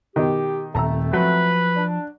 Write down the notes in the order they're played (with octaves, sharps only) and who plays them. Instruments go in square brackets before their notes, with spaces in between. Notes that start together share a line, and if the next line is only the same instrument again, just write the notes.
[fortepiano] B2 D#3 [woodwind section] G4
[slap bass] D#1 [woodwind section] A3 C4 [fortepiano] A5 A#5 E6
[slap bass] F3 [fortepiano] F#3 [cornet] B4
[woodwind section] D4